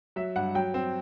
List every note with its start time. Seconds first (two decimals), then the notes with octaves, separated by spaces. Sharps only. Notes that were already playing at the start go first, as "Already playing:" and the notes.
0.16 F#3 E5
0.36 G2 F#5
0.55 F#3 G5
0.74 C4